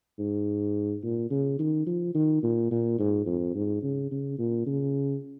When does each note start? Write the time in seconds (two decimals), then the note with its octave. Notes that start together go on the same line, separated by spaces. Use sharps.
0.19 G#2
1.03 A#2
1.30 C#3
1.59 D#3
1.86 F3
2.15 D#3
2.43 A#2
2.71 A#2
2.99 G#2
3.26 F2
3.55 G#2
3.83 C#3
4.11 C#3
4.38 A#2
4.66 C#3